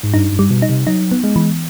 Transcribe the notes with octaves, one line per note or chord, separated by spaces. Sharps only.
G#2
G2 D#4
G2
G3
B2
D#4
C3
F#3 D#4
B3
G#3
E3